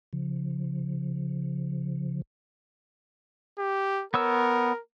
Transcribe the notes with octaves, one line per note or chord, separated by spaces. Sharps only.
C#3 F3
G4
B3 A#4 C#5 E6